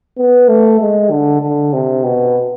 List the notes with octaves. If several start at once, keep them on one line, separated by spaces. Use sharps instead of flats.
B3
A3
G#3
D3
D3
C3
B2